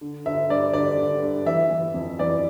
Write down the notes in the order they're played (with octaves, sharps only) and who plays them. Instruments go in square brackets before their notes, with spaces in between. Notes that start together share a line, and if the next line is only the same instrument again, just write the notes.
[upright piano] D3
D3 E5
G2 D5
D3 D5
D3
G2
E3 E5
E3
F2
E3 D5